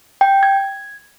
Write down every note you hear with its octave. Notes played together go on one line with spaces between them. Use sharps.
G5
G#6